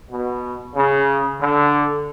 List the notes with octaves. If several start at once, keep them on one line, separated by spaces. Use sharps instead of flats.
B2
C#3
D3